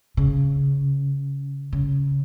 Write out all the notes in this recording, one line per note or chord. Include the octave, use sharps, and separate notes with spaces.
C#3
C#3